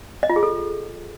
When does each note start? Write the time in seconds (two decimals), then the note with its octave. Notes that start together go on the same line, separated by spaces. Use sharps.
0.23 D#5
0.30 F4
0.36 G#4
0.43 A4